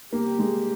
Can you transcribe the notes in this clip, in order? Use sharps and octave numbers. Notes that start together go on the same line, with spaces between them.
C3 G3 A#3 D4 G4
G#3